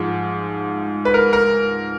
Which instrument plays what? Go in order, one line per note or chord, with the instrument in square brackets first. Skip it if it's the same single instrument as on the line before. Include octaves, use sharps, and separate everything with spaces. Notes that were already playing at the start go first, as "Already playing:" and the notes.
Already playing: [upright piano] G#2 F3 G#3
[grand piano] B4
A#4
A#4